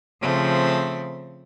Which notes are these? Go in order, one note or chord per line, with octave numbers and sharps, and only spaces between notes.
C#3 F3 A3 C4